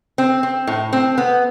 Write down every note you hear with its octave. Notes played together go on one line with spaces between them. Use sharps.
C4
C4
A2
C4
B3